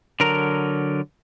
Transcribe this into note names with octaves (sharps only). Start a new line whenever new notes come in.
D3 F#3 A#4 A#5